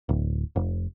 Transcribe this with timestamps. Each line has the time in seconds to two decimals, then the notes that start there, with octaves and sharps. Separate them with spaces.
0.09 D1
0.56 F1